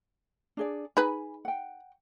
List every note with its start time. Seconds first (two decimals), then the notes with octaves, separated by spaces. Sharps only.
0.57 D4 G#4 D5
0.97 D#4 G#4 B4 G#5 B5
1.45 F#5 G5